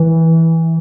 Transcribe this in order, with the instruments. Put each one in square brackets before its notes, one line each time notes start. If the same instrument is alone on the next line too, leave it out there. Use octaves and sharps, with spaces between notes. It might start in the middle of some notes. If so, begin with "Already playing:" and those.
Already playing: [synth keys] E3